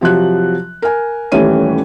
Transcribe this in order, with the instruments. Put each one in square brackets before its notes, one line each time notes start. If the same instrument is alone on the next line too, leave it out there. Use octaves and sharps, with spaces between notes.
[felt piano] C3 F3 F#3 F#6
A#4 G#5
D#1 E3 G3 A3 C#4 D#7